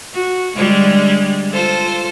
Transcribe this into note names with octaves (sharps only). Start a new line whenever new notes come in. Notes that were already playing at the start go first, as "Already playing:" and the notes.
F#4
D3 G3 G#3
F4 A4 C5